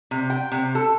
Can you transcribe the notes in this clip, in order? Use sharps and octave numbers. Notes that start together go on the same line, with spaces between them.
C3
G5
C3
A4